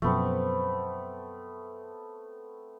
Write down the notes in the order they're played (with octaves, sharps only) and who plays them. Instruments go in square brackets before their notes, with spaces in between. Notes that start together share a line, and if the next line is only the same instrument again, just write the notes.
[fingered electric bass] F#2 B2 F3 [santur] A3 B3 C4